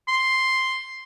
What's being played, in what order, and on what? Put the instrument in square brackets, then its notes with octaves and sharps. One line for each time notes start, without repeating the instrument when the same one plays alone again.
[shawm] C6